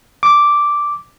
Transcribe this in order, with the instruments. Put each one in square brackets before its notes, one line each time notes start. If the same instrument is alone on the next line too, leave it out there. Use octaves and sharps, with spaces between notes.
[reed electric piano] D6